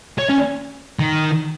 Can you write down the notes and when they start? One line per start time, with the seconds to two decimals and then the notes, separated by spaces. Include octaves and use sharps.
0.19 C#5
0.29 C#4
0.99 D#3